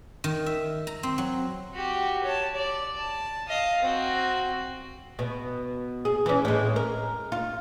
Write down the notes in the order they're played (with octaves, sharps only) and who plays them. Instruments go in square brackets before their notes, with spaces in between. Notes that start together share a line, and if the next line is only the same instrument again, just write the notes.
[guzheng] D#3
E5
A#5
C4
F#3
[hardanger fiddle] F#4 G4
C#5 A5
D5
A5
D#5 F5
C4 F#4
[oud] B2
G#4
E3 C#4
A2 G#3
A#4
F4